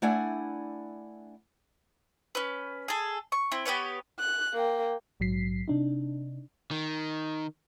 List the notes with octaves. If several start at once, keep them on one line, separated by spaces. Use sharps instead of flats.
A3 D4 E4 D5 F#5 G#5
C#4 B4
G#4 A4
C#6
C4 E4
B3 G4 B4 C#5
F#6
A#3 G5
A#1 G#2 F#3 B6 C7
C3 D4 D#4
D#3